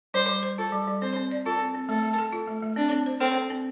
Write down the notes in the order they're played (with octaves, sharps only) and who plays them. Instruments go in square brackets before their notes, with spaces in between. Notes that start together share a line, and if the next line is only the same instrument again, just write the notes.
[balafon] G3 [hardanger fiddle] C5
[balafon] G3
C5
[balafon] F4 [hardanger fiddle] A4
[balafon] G3
G3
[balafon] C4 [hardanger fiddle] C5
[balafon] C4
D5
[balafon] F4 [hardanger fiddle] A4
[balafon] C4
C4
[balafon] A3 [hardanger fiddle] A4
[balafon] A3
A4
F4
A3
A3
[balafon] C4 [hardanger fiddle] D4
[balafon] C4
C5
[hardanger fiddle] C4 [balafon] A4
[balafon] C4
C4